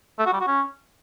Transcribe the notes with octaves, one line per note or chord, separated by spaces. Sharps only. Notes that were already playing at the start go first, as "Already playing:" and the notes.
A3
F#4
G3
F#4
C#4